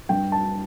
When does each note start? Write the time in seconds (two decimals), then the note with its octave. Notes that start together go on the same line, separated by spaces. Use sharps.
0.09 G2 G5
0.32 A5